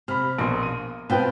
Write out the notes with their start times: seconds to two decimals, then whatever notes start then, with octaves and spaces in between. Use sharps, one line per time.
0.08 C3 B5 F6
0.38 A#1 B2 A#3 C6
0.63 D#7
1.10 B2 C4 F4 B4 G5